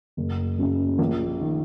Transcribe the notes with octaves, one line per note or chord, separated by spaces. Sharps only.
F#1
F#2 C#3
A#1
D#3